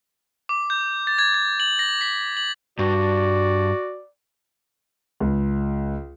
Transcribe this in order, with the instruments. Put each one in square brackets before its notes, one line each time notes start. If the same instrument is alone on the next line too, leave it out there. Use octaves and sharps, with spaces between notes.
[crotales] D6
G6
A6
G#6
G#6
F#7
A#6
B6
F#7
[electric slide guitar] G2 [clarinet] F#4 [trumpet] D5
[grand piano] C#2